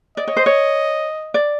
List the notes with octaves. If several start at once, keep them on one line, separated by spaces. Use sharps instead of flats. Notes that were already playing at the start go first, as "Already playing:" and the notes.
D5 D#5
C#5
C5
C#5
D5